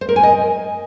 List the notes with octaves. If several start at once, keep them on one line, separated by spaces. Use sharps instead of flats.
C5
A#4
G#5
D#5